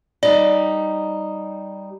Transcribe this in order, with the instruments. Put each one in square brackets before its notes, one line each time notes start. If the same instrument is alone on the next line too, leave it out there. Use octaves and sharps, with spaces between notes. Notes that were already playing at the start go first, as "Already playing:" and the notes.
[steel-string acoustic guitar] G3 D#4 [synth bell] D5